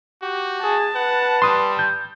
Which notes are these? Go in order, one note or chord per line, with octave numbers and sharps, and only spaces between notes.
F#4 G4
G#4 A5
B4 F#5
G3 C6 D#6
G6